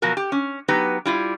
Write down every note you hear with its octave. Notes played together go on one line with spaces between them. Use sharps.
B2 F3 F#3 F#4 A#4
G4
C#4
F#3 B3 D#4 G4 B4
G3 E4 F4